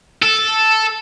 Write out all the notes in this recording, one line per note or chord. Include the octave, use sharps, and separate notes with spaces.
A4